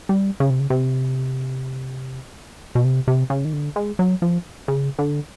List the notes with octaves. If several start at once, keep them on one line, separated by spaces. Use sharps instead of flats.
G3
C#3
C3
C#3
C3
B2
C3
C3
C#3
D#3
D3
G#3
F#3
F3
C#3
D3